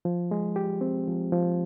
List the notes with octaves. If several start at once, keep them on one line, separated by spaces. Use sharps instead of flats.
F3
G#3
G4
C4
F3
F3